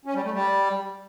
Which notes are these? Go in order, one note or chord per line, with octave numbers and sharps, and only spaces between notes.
C#4
G3
A3
G3